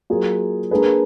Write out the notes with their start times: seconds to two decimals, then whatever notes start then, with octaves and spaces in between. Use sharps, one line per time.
0.10 F#3 A#3 F4 G#4
0.71 A#3 D4 G#4 B4